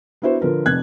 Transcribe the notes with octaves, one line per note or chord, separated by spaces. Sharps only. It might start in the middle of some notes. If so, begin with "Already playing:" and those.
B3 D4 E4 F#4 C5
D3 F3 A#4 B4
F1 F2 F#6 G#6